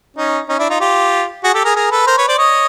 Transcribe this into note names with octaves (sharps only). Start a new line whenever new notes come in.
C#4 D#4
C#4 D#4
D4 E4
D#4 F4
F4 G4
F#4 G#4
G4 A4
G#4 A#4
G#4 A#4
A4 B4
A#4 C5
B4 C#5
C5 D5
C#5 D#5